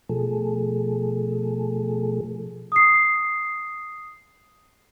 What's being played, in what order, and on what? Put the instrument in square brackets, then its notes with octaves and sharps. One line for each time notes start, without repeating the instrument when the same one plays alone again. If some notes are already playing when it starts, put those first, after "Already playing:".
[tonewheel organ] B2 F3 A3 G#4 A4
[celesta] D#6 C7